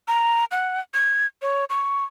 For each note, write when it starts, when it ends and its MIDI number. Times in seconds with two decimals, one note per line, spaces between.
0.08 0.45 82
0.51 0.80 78
0.94 1.26 92
1.42 1.65 73
1.70 2.04 85